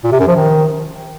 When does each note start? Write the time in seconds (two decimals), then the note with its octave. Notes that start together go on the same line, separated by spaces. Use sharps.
0.04 A#2
0.12 C3
0.19 F#2
0.27 F3
0.35 D#3